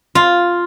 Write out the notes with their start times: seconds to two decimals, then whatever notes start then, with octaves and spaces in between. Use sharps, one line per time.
0.15 F4